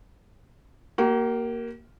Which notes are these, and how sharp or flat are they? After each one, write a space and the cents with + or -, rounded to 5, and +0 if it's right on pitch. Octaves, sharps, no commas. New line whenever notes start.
A#3 +0 G4 -45